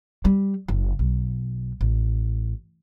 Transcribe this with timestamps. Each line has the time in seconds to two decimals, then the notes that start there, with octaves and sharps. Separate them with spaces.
0.25 G3
0.68 F#1
0.99 B1
1.81 A1